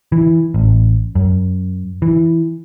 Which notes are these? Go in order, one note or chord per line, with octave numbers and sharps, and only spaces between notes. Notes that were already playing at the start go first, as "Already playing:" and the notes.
E3
A1
F#2
E3